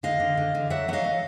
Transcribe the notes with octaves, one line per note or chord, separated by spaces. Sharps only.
D3 D#5 F5
D3
D3
D3
F#3 E5 F#5
F#3 D#5 F5 F#5
F#3